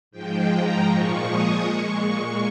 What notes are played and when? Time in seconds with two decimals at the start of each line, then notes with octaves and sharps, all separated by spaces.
0.11 G#2 F3 G#3 G5
0.49 A#5
0.86 A#2 F3 G#3 C#6
1.25 D#6
1.61 A#2 G#3 C#6